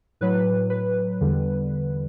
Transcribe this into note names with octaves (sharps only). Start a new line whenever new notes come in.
A2 F#3 B4
B4
E2 D3 G3